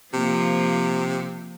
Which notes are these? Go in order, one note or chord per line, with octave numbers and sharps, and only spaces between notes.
C3 F3 A#3